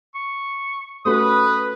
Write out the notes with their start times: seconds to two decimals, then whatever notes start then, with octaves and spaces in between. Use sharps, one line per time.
0.15 C#6
1.05 A3 C#4 F#4 B4 D#6